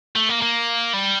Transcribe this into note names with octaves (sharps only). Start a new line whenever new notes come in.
A3
A#3
A#3
G3